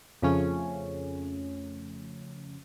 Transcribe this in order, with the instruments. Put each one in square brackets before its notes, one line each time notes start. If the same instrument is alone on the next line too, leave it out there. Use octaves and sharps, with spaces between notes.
[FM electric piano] F2 C#3 F3 A3 C#4